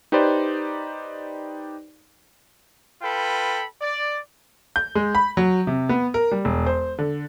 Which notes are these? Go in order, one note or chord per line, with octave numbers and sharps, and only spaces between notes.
D#4 G4 B4 C5 D5
F4 A4 B4 G5 B5
D5
G6
G#3
B5
F#3
C3
B3
A#4
G3
E1
C5
D3